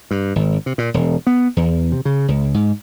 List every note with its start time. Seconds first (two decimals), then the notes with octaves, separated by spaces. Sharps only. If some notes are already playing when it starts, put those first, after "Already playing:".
0.11 G2
0.36 G#1
0.66 C3
0.78 A#2
0.94 E1
1.27 B3
1.57 E2
1.92 C3
2.05 C#3
2.28 C#2
2.54 G#2